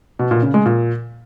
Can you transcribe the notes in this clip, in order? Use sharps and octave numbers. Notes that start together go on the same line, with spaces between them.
B2
A#2
C#3
G#3
A#2